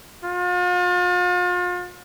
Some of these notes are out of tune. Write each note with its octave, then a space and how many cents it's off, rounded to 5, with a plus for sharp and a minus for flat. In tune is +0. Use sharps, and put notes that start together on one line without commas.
F4 +40